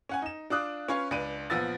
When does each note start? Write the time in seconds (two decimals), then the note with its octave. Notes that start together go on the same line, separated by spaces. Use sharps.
0.09 C#4 F#5 G#5
0.22 D#4 E7
0.50 D4 F4 D6 D#6 F#6
0.88 C#4 F4 B4 C#5
1.11 C#2 D4 B4 D7 D#7
1.50 A#1 F3 B3 E6 A6